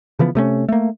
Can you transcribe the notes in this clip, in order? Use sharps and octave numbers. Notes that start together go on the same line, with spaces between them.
C#3 E3 F3 B3
C3 A3 A#3 C#4
A3 A#3